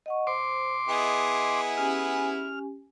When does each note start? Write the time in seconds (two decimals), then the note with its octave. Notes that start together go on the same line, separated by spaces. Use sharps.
0.06 D#5 F#5 C#6
0.27 C5 C6 D6
0.89 B3 E4 G#4 D#5
1.77 C#4 G4 G#5 F6